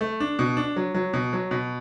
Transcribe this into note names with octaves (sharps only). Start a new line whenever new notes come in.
A3
D4
B2
D4
F#3
F#3
B2
F#3
B2